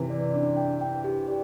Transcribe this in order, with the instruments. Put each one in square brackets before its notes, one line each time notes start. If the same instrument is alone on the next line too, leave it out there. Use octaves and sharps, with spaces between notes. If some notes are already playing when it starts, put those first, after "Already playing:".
Already playing: [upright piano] C3 E3
[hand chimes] D5
D4
G5
G5
G4
D5